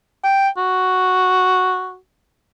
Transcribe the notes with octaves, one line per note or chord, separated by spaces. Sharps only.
G5
F#4